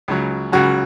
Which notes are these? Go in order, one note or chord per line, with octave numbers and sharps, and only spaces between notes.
C#2 C#3 F#3
C#2 C#3 F#3 F#4